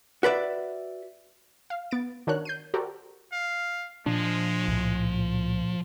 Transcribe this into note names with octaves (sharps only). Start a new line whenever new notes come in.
F#4 B4 D5 E5
F5
B3 A6 D7
D#3 D4 F#4 A#4 C#5 F#6
G6 C7 D#7
F#4 G4 A4 A#4 C5 D5
F5
A#2 F3 G#3 D4
C2 A2